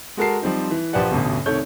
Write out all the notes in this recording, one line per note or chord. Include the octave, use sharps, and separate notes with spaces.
G#3 F#4 A4 A#4 A5 C7
F3 G3 C4 D#4
E3
A#1 F3 G4 B4 D5 F#5
A1 D2 G2 B2
C2 D#3 A3 C#5 G6